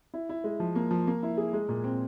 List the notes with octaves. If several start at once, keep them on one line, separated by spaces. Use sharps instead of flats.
E4
E4
G#3
F3
A#3
F3
A#3
E4
G#4
G#3
A#2
C4